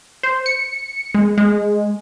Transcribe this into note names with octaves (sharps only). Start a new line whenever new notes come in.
C5
C#7
G#3
G#3